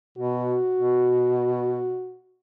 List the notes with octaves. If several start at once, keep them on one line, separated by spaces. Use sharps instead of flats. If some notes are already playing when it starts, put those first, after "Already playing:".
B2 F#4
B2